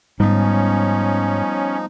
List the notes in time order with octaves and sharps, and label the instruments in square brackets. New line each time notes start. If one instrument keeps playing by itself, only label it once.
[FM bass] G#2 [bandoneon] F3 D#4 [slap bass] G3 B3 [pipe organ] C#4